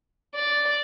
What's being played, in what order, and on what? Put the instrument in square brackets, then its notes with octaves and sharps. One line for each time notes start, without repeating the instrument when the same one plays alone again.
[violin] D5